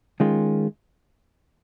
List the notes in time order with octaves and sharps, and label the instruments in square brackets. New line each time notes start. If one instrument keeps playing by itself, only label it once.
[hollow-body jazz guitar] D#3 G#3 C#4 F4